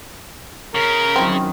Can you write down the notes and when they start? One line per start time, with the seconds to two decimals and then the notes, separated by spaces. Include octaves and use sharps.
0.75 C#3 A#4
1.16 F#2 D#3 F#3 C4 E4